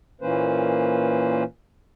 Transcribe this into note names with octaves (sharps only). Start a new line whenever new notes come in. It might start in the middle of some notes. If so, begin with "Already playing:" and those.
A#2 E3 A#3 C#4 B4 C5